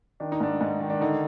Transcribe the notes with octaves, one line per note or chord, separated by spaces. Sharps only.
D#3 D4
D#4
G#2 D4
G#2
D#3
D4
D3 D#4